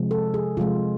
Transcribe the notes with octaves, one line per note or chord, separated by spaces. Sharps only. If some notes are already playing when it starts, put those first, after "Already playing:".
Already playing: C3 F3 G#3
A4
G#4
C3 F3 G#3 F4